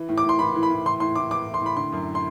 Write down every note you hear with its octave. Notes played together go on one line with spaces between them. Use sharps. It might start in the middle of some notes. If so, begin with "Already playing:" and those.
Already playing: E3
A2
D6
A2
C6
E3 B5
E3
B5
A2
E3 C6
A2 C6
A2 D6
E3 D6
E3
C6
A2 B5
D3 C6
F#2
C6